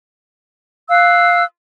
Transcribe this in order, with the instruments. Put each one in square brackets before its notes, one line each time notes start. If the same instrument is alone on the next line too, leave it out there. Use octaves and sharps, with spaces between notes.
[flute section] F5 E6 F#6